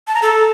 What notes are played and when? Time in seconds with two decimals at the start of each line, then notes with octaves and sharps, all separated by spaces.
0.07 A5
0.15 A#5
0.22 A4